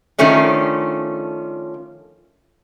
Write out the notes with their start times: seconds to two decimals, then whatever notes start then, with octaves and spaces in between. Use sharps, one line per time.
0.19 D#3 F3 A3 C#4 D4